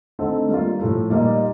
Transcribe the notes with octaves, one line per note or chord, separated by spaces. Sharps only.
D3 A3 C4 D#4 A4
G3 A#3 F4
A2 F3 A3
A#2 G3 A#3 D#4